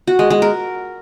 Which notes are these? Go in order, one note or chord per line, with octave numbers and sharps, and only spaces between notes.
F#4
G#3
G#3
A#4